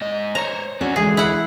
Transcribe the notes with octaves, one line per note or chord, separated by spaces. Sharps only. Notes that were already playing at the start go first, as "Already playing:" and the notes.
G#2 D#5
C5 C#5 A#5
C#4 D4 F#4
D2 E3 G#3 G#4
E4 F#5